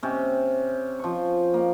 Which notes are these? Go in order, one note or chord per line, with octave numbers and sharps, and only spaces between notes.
C3 C#4
F3 C#6
A#3